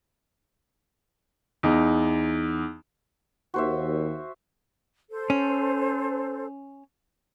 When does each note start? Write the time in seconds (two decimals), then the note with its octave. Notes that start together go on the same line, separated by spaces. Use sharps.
1.63 E2 D#4
3.54 D#2 F#4 C5 E5
5.11 A4 C5
5.30 C#4